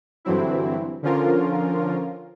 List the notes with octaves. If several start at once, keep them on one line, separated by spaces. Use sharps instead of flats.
G2 D3 E3 F#3 C4 E4
D3 F3 C#4 F4 A#4